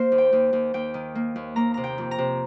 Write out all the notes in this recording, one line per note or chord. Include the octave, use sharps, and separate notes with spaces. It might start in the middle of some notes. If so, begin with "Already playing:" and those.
Already playing: A#3 C5
D#2
G5
D#2
D#2
D#2 G5
D#3
A#3
D#2
A#3 A#5
C3 A#5
G5
F2
A#5
C3